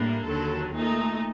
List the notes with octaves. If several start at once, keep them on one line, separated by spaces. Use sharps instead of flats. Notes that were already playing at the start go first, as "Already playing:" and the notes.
Already playing: A2 G3 A#3 D4
D#2 D3 F#3 A4
A#2 A3 D#4